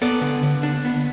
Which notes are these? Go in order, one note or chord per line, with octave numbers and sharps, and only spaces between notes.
B3 A4 D5
D3
D3
D4
B3